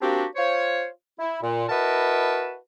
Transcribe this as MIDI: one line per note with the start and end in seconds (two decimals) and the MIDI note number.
0.02 0.24 58
0.02 0.24 60
0.02 0.24 62
0.02 0.24 66
0.02 0.24 67
0.36 0.87 65
0.36 0.87 72
0.36 0.87 73
1.19 1.39 64
1.42 1.64 46
1.69 2.55 64
1.69 2.55 66
1.69 2.55 70
1.69 2.55 71
1.69 2.55 75
1.69 2.55 81